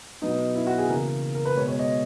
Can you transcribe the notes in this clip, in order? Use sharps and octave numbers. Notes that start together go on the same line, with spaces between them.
B2 F#3 B3 D#4
E4
F#4
G#4
C#3 E3 A#3 A#4
A#4
B4
B2 G#3 B3 C#5
C#5
D#5